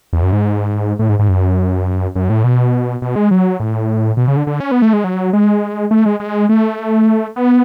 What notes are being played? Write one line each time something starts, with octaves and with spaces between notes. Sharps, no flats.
E2
F#2
G#2
A2
G#2
G#2
F#2
F#2
A2
B2
B2
G#3
F#3
A2
B2
C#3
D3
D3
C#4
B3
A3
G#3
F#3
G#3
A3
G#3
G#3
A3
B3